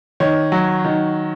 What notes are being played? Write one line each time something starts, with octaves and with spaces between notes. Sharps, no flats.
D#3 C#5
F#3
D#3